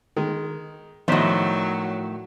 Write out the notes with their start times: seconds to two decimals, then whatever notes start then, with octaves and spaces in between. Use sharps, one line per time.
0.17 D#3 G#3
1.08 A2 D#3 F3 F#3 C5 D#5 B6 E7